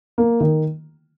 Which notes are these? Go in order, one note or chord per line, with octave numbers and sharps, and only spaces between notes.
A#3
D#3